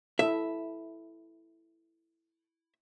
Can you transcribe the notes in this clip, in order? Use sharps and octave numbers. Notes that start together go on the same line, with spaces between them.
E4 A4 E5